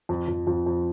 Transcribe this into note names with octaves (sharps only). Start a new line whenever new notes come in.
F2
F2
F2
F2